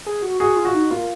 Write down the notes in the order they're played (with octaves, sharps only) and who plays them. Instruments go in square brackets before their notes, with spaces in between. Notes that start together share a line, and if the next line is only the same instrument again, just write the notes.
[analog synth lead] G#4
F#4
[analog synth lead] F#4 [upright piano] G#4
[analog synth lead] F4
[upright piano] F#4
[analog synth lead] D#4
[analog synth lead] A#3 [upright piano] F4